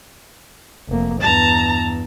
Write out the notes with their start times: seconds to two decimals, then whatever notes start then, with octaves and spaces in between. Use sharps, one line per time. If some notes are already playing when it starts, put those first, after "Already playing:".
0.88 F1 A#3
1.21 E2 G2 A5 A#5